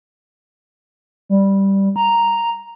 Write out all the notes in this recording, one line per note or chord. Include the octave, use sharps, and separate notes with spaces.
G3
A#5